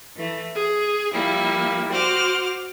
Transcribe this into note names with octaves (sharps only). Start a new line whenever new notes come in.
E3 A3
G#4
F3 G3 A#3 E4
F#4 C5 F#5 D6 F6